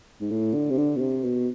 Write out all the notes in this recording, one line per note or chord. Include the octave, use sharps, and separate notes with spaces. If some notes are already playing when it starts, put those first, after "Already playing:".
G#2
A2
D3
C3
D3
B2
C3
B2